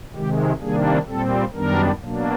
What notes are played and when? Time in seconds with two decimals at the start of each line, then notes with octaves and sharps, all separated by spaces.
0.15 C3 D#3 G#3 G4
0.61 C3 D#3 G3 A#3 D4 G#4
1.07 A#2 G3 C4 A4
1.54 F#2 D#3 G3 B3 D4 A#4
2.00 B2 F#3 A#3 D4